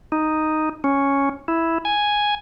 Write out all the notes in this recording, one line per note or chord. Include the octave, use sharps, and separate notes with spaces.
D#4
C#4
E4
G#5